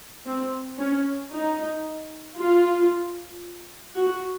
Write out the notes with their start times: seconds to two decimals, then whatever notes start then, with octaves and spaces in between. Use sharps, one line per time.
0.27 C4
0.79 C#4
1.32 D#4
2.38 F4
3.95 F#4